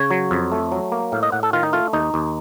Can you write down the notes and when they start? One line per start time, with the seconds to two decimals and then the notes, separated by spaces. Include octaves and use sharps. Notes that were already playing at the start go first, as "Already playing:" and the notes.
Already playing: C#3 C#5
0.11 F#3
0.31 F2
0.52 A3
0.72 F#3
0.92 A#3
1.12 A2 F5
1.23 D#5
1.32 A2 F#5
1.43 A4
1.53 D#3 F4
1.63 D#4
1.73 A3 F4
1.93 D#2 D#4
2.14 D#2